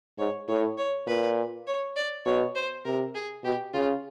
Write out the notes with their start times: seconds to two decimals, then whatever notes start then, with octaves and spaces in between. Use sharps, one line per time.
0.19 G#2 C#5
0.48 A2 C#5
0.78 C#5
1.07 A#2 B4
1.67 C#5
1.96 D5
2.25 B2 C#5
2.55 C5
2.85 C3 A#4
3.15 G#4
3.44 B2 G4
3.74 C#3 F4